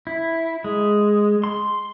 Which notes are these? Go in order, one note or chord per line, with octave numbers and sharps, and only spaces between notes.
E4
G#3
C6